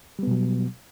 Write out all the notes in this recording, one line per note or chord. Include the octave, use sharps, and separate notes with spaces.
B2 F#3 G3 B3